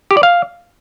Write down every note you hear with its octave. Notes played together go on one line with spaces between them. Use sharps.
G4
D5
F5